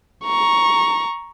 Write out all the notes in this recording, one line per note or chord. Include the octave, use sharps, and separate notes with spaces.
A#5 C#6